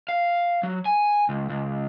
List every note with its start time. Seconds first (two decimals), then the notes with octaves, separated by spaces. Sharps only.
0.09 F5
0.63 F#3
0.86 G#5
1.29 C#2
1.49 C#2